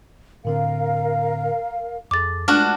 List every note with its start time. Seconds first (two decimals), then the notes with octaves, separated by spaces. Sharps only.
0.45 A2 D3 C4 A#4 F5
2.11 F2 G#4 A4 D6 A6
2.48 G#3 A3 D4 F4 F#4 F6